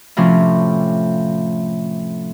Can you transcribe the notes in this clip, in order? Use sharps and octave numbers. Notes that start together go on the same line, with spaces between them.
A2 C3 F3 C#4